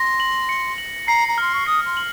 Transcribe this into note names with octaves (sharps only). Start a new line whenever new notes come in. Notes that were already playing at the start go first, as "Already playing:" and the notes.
Already playing: C6 A#6
F#7
C#7
F#7
A#5 C7
A#5
C6 F6
C#6
D#6 C7
C6
F#7